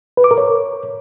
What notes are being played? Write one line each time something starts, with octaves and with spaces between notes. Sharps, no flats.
B4
D6
A#4
C#5